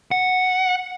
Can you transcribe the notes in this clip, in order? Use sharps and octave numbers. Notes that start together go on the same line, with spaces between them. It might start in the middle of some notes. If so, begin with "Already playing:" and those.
F#5